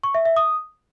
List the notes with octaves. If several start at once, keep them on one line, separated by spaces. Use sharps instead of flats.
C#6
E5
E5
D#6